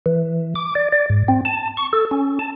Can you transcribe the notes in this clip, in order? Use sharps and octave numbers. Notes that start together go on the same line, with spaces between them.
E3
D6
D5
D5
G#2
C4
A5
C#6
A4
C#4
A5